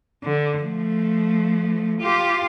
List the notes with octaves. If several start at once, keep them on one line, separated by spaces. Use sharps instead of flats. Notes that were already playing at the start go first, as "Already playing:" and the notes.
D3
F3 A3
F4 G4